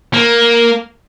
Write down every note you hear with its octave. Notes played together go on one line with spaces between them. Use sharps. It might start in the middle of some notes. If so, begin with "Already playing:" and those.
A#3